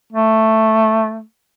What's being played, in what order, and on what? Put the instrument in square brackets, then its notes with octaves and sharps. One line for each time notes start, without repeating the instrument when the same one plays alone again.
[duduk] A3